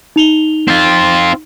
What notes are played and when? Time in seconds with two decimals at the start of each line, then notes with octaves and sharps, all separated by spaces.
0.16 D#4 F7 G7
0.68 C4 F4